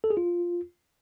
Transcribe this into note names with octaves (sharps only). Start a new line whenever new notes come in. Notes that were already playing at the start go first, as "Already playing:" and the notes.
A4
G#4
F4